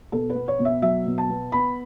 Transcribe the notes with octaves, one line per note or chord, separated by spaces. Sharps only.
B2 A4
B4
B3
C#5
B2
E5
F#3 E5
B2
A5
B3
B3 B5